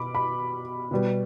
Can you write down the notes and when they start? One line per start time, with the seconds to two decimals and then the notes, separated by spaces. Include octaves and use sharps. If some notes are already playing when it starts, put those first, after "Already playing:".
Already playing: B2 B5 D6
0.15 B5
0.91 B2 G3 B3